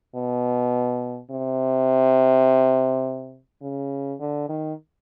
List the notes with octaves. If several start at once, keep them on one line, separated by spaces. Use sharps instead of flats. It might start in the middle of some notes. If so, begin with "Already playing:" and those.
B2
C3
C#3
D3
D#3